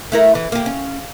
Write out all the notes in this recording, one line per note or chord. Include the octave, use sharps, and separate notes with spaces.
A3 E4 A#4
E3
A#3 G4
C#4